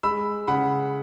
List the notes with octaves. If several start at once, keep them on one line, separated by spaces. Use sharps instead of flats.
G#3 B5 E6
C#3 F#5 B5